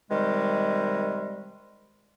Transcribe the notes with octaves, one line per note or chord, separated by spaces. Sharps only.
C3 D#3 G3 G#3